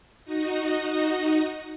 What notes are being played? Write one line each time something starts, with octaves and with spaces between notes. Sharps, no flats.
D#4 F#4 D#5